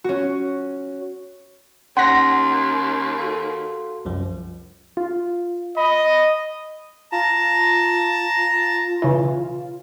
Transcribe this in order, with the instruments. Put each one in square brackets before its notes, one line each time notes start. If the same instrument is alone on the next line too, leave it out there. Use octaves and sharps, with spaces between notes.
[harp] C#4 F#4
[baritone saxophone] D#2 [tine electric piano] C#4 [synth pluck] F#5 A#6 [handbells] C6
[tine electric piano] F#4 A4 F5
C2 F#2 F3
[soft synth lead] F4
[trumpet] D#5 [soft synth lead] B5
[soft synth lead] F4 [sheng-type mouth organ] A5 A#5
[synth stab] B1 C#3 E3